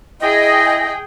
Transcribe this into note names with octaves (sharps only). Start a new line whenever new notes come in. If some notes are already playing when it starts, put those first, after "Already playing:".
E4 G#4 D#5 G5